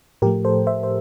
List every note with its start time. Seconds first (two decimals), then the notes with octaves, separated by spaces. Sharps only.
0.22 A2 F3 A3 G4 A#4
0.45 A4 C5
0.67 C5 E5
0.83 C5